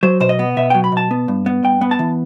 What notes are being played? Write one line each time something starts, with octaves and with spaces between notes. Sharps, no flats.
F#3 C5
B2 C5
D#5
B3
B2 E5
F#3 G5
B5
B2 A5
B3
G2
B3
G2 G5
B3
A5
E3